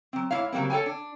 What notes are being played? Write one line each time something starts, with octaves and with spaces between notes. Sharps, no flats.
F#3 C4
G#2 G3 E4 C#5 F5
C#3 F#3 G3 A#3 C4
A4 C#5 G5 G#5
D4